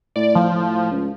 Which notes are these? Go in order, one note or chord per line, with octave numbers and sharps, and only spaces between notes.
A2 D5
F3
A2
C#2